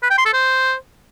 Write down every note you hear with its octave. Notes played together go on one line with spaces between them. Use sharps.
B4
G5
C6
A4
C5